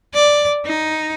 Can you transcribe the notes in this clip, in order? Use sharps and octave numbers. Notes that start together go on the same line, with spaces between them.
D5
D#4